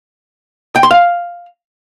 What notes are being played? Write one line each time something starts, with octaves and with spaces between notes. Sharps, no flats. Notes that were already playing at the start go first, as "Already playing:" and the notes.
G5
C6
F5